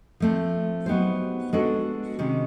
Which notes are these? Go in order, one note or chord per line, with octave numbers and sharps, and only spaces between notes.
F3 A3 C4
F#3 B3 D#4 G4 C5
G#3 B3 D4 F#4 A4
C3 D#3 G#3 C#4